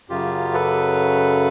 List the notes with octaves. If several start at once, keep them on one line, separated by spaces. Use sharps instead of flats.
F#2 C#3 F#3 F4 G4
A4 B4